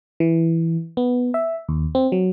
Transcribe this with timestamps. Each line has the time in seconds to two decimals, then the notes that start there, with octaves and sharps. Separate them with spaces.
0.20 E3
0.97 B3
1.34 E5
1.69 D#2
1.95 C4
2.12 F#3